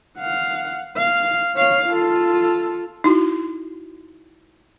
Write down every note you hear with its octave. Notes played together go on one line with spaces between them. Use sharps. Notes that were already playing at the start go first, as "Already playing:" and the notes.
F5 F#5
F5
C#5 F5
F4 A4
D#4 E4 F#4